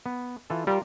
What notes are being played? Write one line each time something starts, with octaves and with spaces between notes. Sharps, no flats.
B3
E3 F4 A4
G3 F4 A#4